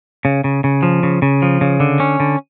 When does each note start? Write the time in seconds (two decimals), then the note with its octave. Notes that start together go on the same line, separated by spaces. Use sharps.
0.25 C#3
0.44 C#3
0.64 C#3
0.83 F3
1.03 C#3
1.22 C#3
1.42 F3
1.61 C#3
1.80 D3
2.00 C#4
2.20 D3